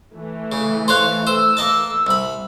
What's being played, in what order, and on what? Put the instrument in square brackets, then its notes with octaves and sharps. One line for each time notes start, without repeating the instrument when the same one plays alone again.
[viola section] E3 A3
[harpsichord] C#3
[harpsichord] C5 C#5 F5 [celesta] C6 F#6
[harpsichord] C5 [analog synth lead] E6
[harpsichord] A#3 D#5 A5
[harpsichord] C2 B5 [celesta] E6